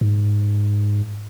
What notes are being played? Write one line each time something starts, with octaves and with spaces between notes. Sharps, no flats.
G#2